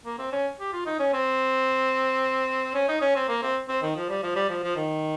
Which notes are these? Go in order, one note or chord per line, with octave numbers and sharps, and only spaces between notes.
A#3
C4
C#4
G4
F4
D#4
C#4
C4
C#4
D#4
C#4
C4
A#3
C4
C4
D#3
F3
G3
F3
G3
F3
F3
D#3